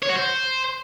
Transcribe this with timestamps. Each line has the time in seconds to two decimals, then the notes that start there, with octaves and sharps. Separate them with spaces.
0.02 C#5
0.09 F#4
0.16 C5